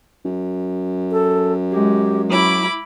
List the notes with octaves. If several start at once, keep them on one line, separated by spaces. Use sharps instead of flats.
F#2
A4
G#3 G4
F#3 E4 B5 D6